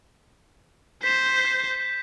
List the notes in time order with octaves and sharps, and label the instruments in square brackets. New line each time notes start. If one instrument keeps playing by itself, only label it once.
[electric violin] C5 [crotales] B6 E7
[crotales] G6